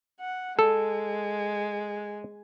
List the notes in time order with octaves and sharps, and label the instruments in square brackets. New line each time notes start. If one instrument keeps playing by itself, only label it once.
[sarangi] F#5
[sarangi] G#3 [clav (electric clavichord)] A4